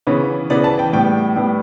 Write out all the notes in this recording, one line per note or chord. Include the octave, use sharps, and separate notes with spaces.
C#3 E3 B3 C#5
C#3 E3 B3 D5
A5
G5
A2 G3 B3 G5
A2 G3 B3